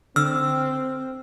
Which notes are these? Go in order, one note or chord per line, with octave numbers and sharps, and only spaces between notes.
D3 C4 E6 F6